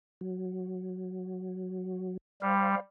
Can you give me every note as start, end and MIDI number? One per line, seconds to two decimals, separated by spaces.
0.21 2.17 54
2.42 2.75 55
2.42 2.80 72
2.42 2.80 77